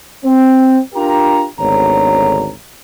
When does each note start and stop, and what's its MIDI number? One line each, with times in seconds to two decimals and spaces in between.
0.25 0.78 60
0.95 1.45 62
0.95 1.45 65
0.95 1.45 67
0.95 1.45 70
0.95 1.45 82
1.59 2.50 32
1.59 2.50 38
1.59 2.50 50
1.59 2.50 59
1.59 2.50 73
1.59 2.50 82